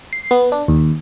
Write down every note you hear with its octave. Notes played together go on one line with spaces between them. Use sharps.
C7
B3
D4
D#2